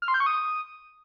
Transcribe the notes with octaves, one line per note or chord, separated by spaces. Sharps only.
F6
C6
G6
C#6
D#6